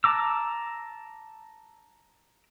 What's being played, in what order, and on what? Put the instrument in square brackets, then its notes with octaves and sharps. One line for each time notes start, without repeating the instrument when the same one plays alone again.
[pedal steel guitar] A5 A#5 D6 E6